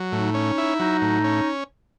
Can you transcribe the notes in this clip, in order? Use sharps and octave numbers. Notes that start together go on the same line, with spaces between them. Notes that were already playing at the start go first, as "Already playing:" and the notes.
Already playing: F#3
A2 D#4
C#4
E4
F#3 D#4
A2
C#4